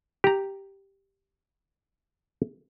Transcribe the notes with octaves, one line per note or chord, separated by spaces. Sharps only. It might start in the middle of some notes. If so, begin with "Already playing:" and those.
G4 A#5